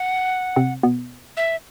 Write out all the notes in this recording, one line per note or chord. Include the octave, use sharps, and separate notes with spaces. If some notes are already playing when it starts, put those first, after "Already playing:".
Already playing: F#5
C3 C4
B2 B3
E5